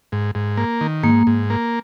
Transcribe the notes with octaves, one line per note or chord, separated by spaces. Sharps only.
G#2
G#2
A#3
D#3
G#2 A#3
G#2
A#3